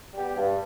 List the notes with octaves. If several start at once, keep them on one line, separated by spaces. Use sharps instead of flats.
G3 B3 G4
G2